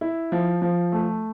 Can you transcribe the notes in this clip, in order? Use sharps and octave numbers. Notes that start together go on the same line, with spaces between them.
E4
F3
F3
A3